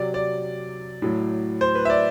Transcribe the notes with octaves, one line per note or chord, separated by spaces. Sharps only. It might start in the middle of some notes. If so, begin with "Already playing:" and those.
Already playing: C3 F#3 D5
D5
A2 F#3
C5
B4
E5
D5